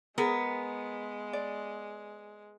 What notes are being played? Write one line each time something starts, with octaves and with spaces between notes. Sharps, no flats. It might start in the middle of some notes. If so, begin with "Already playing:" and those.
G#3 B3 G#4 A#4
D5